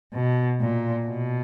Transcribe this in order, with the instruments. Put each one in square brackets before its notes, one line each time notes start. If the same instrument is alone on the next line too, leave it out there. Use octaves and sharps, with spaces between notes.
[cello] B2
A#2
B2